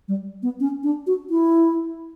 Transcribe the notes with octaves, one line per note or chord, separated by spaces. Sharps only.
G3
B3
C#4
D4
F#4
E4